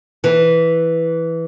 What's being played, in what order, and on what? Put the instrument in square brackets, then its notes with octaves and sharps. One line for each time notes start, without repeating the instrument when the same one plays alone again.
[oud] E3